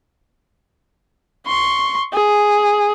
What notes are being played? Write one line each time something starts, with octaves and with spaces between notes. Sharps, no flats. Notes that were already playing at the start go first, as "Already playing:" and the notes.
C6 C#6
G#4